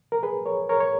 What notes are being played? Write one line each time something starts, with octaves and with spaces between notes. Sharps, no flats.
A#4
G#4 B4
A#4 C#5
A#4 C#5
C#5